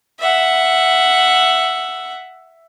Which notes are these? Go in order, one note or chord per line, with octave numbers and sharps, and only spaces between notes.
E5 F#5